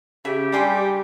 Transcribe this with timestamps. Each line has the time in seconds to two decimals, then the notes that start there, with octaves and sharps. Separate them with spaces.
0.25 C#3 G4 E5
0.52 G3 D4 G#4 C6